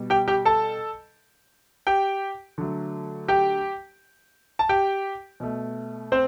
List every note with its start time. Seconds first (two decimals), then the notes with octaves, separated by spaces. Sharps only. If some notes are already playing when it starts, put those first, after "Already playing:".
Already playing: B2 G3
0.10 G4 G5
0.28 G4 G5
0.45 A4 A5
1.87 G4 G5
2.58 D3 F#3 A3
3.28 G4 G5
4.59 A5
4.69 G4 G5
5.40 B2 A3
6.12 C4 C5